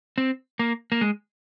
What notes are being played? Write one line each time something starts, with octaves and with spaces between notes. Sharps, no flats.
C4
A#3
A#3
G#3